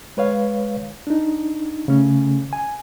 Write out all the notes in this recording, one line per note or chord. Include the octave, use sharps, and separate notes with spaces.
G#3 B4 C#5 F5
D4 D#4
C#3 A3 C#4
G#5